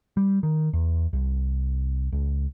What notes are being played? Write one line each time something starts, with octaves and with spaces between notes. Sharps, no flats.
G3
D#3
E2
C2
C#2